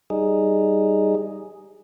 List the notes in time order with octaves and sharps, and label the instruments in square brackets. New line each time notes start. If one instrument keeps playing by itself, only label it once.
[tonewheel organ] G3 D#4 G#4